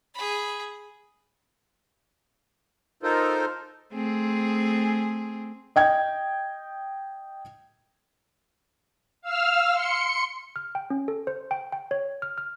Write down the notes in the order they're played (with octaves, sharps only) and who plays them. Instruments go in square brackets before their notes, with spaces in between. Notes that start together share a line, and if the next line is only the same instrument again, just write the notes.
[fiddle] G#4 B5
[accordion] D#4 F4 A4 A#4 C5
[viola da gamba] A3 C4 G#4
[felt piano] D#5 G5 G#6
[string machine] F5 E6 F6
C6 C#7
[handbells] F6
G5
C#4
A4
C5
G5
G5
C#5
F6
F6